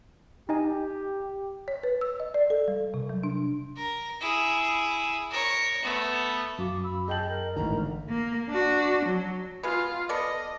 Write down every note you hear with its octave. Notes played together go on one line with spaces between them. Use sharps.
D#4 G4 D#5 G#5
C#5
B4
E6
D#5
D5
A4
G3
C3
F#3
D4
A#4
E4 G#4
A#4 C#5
A3 B3
F#2 F#4 F5 D6
B5 E6
G#4 C#5 D#5 G5 A5 G6 F#7
A#4
G#1 A2 D3 E3 A#5
A#3
D4 F#4
F#3
G#3 B3 F4
B3 A4 D5 D#5